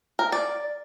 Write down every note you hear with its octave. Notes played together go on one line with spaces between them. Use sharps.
A#4
D5